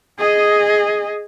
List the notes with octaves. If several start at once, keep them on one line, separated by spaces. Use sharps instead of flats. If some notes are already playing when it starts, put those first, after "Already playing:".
G#4 D#5